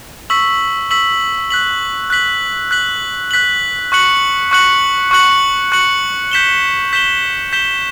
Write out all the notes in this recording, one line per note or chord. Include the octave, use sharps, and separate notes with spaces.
C#6 E6 B6 F#7
C#6 E6 B6 F#7
F#6 B6 F#7
F#6 B6 F#7
F#6 B6 F#7
F#6 B6 F#7
C#6 F#6 C#7 F#7
C#6 F#6 C#7 F#7
C#6 F#6 C#7 F#7
C#6 F#6 C#7 F#7
G6 B6 E7 G7
G6 B6 E7 G7
G6 B6 E7 G7